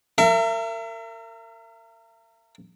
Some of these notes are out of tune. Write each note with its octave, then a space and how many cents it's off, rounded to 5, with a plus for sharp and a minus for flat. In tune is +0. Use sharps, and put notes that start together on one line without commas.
A#4 -35 E5 +35